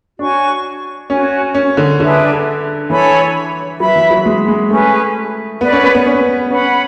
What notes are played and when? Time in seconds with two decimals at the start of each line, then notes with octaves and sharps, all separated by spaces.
0.19 D4 F#4 C#5 G#5 C#6
1.09 C#4 F#4 C#5 G#5
1.54 C#4
1.77 D3
1.99 D3 D4 G#4 B4 E5
2.90 E3 A4 C#5 G#5 B5
3.80 F#3 B4 E5 B5
3.95 E3
4.10 F#3
4.26 G#3
4.48 G#3
4.70 A3 C#4 G#4 B4
5.61 B3 B4 D5 F#5 B5
5.72 C#4
5.84 B3
5.94 B3
6.06 C#4
6.51 C#4 B4 F#5 B5